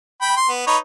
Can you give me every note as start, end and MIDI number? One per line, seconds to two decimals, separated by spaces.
0.22 0.36 79
0.22 0.36 83
0.37 0.49 84
0.49 0.65 59
0.67 0.77 63
0.67 0.77 71
0.67 0.77 73